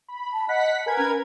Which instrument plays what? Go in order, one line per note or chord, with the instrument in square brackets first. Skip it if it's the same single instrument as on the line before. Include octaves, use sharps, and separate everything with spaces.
[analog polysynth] B5
[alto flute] A5
[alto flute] D#5 [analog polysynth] F#5 B6
[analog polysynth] A#4 B4 G#6 [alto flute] G#5
[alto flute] C#4